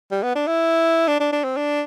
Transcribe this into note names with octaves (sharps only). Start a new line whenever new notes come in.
G3
B3
D4
E4
D4
D4
D4
C4
D4